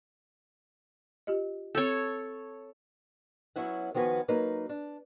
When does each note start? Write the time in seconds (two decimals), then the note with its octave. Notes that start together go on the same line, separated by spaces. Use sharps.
1.27 F4 G4 D#5
1.75 C4 A4 C#5 E6 G6
3.56 F#3 B3 C#4 E4 F#5
3.94 D#3 F3 B3 F#4 B4 G#5
4.28 F#3 A#3 D#4 B4
4.69 D4